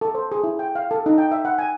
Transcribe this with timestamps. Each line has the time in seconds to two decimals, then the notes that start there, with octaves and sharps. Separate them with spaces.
0.01 A4
0.15 C5
0.32 G#4
0.44 E4
0.59 G5
0.75 F5
0.91 A4
1.06 D#4
1.18 G5
1.32 E5
1.45 F#5
1.58 G#5